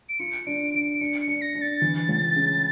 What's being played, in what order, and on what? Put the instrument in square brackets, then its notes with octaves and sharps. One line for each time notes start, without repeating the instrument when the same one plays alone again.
[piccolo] D7
[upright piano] F4 [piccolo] C#7
[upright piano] D4 [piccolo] D7
[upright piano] D4 [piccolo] D7
[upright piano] D4 [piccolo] C#7
[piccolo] C#7
[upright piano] D4
[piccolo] A#6
[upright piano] D4
[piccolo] A6
[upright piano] E3
C#2
C#3